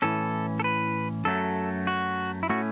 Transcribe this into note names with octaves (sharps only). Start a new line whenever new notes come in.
A2 E3 C#4 A4
A4
B4
F#2 F#3 A3 A4
F#4
E4
A2 A3 C#4 F#4